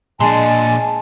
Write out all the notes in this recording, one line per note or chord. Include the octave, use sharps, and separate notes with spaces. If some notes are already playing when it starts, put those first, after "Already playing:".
A#2 G#3 D4 G#5 A5 C6